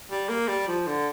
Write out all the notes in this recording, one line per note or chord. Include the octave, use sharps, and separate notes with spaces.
G3
A#3
G3
F3
D3